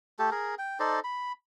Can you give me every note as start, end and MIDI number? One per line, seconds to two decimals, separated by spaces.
0.19 0.30 57
0.19 0.30 67
0.19 0.30 69
0.31 0.55 68
0.31 0.55 70
0.58 0.79 79
0.80 1.00 63
0.80 1.00 69
0.80 1.00 72
0.80 1.00 74
1.04 1.32 83